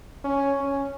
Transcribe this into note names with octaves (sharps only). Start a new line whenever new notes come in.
C#4
C#4